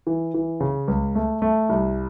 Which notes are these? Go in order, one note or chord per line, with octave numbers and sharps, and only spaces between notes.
E3
E3
C#3
C#2
A3
A3
C2